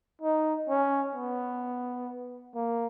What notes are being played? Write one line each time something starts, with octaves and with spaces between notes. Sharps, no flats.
D#4
C#4
B3
A#3